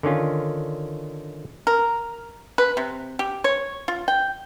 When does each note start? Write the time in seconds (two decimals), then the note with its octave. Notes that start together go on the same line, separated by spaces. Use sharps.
0.03 D3 D#3 C#4 F4
1.67 A#4
2.58 B4
2.77 C3
3.19 G4
3.44 C#5
3.88 F4
4.08 G5